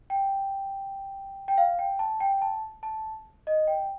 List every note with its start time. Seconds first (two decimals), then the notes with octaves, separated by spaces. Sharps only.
0.10 G5
1.48 G5
1.58 F5
1.79 G5
1.99 A5
2.20 G5
2.33 G5
2.42 A5
2.83 A5
3.47 D#5
3.67 G5